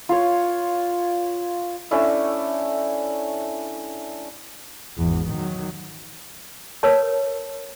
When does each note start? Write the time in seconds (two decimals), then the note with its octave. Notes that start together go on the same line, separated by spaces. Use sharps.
0.09 F4 C#5
1.91 A3 C#4 D4 E4
4.97 G#1 E2
5.29 D#3 F#3
6.83 A#4 B4 C#5 A5